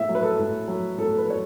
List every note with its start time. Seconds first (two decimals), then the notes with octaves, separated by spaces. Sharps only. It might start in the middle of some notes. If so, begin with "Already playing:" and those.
Already playing: A2 E5
0.09 F#3
0.15 B4
0.23 A4
0.39 A2
0.68 F#3
0.98 A2 A4
1.18 B4
1.28 F#3 C#5